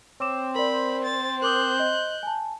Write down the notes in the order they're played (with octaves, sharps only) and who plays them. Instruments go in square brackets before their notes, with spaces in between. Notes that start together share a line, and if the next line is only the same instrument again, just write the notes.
[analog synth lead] C4 [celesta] C#5 D6 E7
[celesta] A#4 D5 [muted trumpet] C5 [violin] B5
[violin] A6
[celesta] A#4 D6 D#6 [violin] F#6 G6
[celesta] D#5
G#5 A5